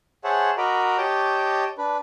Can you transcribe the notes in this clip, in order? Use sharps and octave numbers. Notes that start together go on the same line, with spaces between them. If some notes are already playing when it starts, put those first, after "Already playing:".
G#4 C5 C#5 E5 F#5 A5
F#4 A#4 D#5 A#5 B5 D6
G4 C#5 D#5 A5 D6 G6
D4 B4